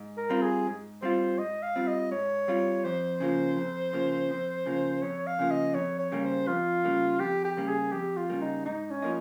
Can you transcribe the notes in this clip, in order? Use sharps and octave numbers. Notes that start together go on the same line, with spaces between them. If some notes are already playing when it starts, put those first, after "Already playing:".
Already playing: G#2
A#4
G3 C4 F4
G#4
G#2
G3 C4 F4 C5
G#2 D#5
F5
G3 C4 F4
D#5
G#2 C#5
G3 C4 F4
F2 C5
C#3 F3 A#3
F2
C#3 F3 A#3
F2
C#3 F3 A#3
F2 C#5
F5
C#3 F3 A#3
D#5
F2 C#5
C#5
C#3 G3 A#3
C5
F2 F4
C#3 G3 A#3
F2 G4
G4
C#3 G3 A#3
G#4
F2 G4
F4
C#3 G3 A#3
D#4
G#2 D#4
C#4
F3 A#3 D#4